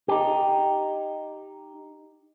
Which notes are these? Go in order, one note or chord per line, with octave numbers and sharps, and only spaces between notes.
D#4 G4